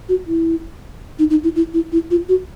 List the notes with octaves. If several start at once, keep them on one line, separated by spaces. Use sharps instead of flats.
F#4
E4
D#4
D#4
E4
E4
E4
E4
F4
F#4